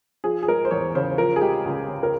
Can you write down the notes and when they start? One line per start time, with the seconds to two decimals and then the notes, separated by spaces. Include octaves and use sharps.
0.24 F3 G#4
0.43 G#4
0.48 G#3 A#4
0.65 C5
0.71 E2 C#5
0.95 C#3 C5
1.18 F3 A#4
1.36 G#4
1.41 G#3 G4
1.65 C#2
1.88 C#3
2.03 A#4